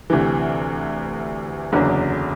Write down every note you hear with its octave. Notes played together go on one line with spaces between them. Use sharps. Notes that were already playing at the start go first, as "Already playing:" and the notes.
D2 C3 E3
F#1 E2 D3 F#3